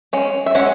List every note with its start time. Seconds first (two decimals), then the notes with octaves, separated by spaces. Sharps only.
0.13 G#3 C#4
0.46 E5
0.55 G#3 C#4 F#5